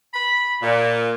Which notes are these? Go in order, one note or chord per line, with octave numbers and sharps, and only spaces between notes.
B5
A#2